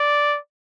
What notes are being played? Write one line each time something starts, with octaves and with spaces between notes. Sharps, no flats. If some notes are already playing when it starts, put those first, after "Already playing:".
Already playing: D5